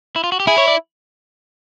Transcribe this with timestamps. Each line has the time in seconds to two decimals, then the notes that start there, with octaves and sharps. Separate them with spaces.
0.16 E4
0.24 F4
0.32 F#4
0.40 G4
0.47 E4 G#4
0.58 C#5
0.68 D5